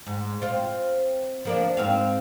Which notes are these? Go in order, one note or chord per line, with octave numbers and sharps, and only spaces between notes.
G#2
C4 F4
F3 A#3 D4
G#2 C4 F5